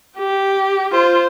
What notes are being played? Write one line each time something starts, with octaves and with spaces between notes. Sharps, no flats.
G4
F4 C5